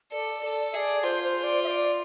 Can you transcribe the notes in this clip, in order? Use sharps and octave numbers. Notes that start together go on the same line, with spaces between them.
A4 D5
A4 D5
G#4 D5 E5
F4 C5
C5
D5
E5
D5